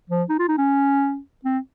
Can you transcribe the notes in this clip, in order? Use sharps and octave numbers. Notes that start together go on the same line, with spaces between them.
F3
D#4
F4
D#4
C#4
C4